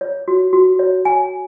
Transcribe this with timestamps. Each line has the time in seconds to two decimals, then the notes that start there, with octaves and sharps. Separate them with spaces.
0.01 C#5
0.28 F#4
0.53 F#4
0.79 C#5
1.05 G#5